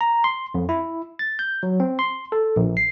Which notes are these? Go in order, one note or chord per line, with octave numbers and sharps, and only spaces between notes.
A#5
C6
F2
E4
A6
G6
F#3
C4
C6
A4
A#1
C7